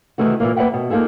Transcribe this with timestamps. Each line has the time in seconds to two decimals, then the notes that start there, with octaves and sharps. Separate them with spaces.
0.18 C3 D#3 E3 A3 F#4
0.40 A#2 E3 A#3
0.56 A#3 B4 D5 E5 F#5 G5
0.74 B2
0.90 A#3 D#4 F4 G#4 A4